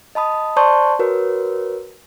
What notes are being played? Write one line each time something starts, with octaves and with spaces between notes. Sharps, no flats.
D#5 A5 B5 D#6
C5 D5 A5 C6 C#6 G6
F#4 A#4 B4 C#5